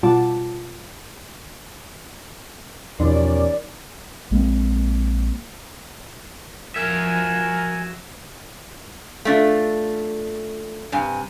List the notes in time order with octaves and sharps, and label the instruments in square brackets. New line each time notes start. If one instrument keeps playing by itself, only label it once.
[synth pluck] B2 G3 F4 F#5 A5 D6
[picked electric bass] E2 B2 F3 [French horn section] C#4 G4 A#4 [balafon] D#4 [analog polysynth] D5
[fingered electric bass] A#1 G#3 A#3 C4
[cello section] F3 [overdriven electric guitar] F#4 E5 [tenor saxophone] A#4 [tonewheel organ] G#5
[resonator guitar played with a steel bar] A3 D4 F4
G2 C3 G#5